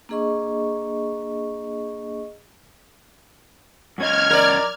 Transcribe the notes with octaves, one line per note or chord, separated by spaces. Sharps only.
A#3 D4 G#4 D#5 C#6
F#2 C#4 D#5 F6 G#6
A#4 D5